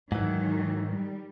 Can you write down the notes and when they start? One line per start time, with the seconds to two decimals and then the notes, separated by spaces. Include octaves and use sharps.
0.12 G#2 D#3 E3 F#3
0.90 G3